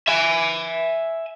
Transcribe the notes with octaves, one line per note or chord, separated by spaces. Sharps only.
E5 G#5